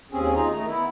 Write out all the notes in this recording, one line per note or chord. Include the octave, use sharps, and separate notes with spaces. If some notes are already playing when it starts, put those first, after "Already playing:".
D#2 C4 C#4 G#4
D#4 F4 G#4 A#5
D#3 A3 A#5
B3 E4